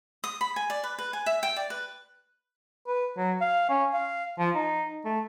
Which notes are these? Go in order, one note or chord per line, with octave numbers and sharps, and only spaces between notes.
D#6
B5
G#5
D5
B4
B4
G#5
E5
G5
D5
B4
B4
F#3
F5
C#4
F5
F3
D#4
A3